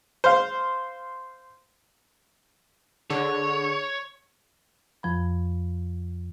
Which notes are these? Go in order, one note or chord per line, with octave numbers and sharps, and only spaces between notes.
C5 F5
D3 G#4 C#5
F2 F3 B5